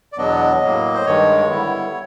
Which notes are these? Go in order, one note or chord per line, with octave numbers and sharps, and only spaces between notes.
D5
E2 B2 F#3 B3 D4 D#5
A2 F#3 A#3
C5
G2 D#3 G#3 C#5
D3 G3 B3 E4